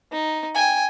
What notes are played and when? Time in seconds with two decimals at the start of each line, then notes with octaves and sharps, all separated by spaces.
0.12 D#4
0.55 G5 G#5